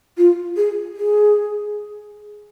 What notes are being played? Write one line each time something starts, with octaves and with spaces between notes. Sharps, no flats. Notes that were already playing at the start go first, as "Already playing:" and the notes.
F4
G#4
G#4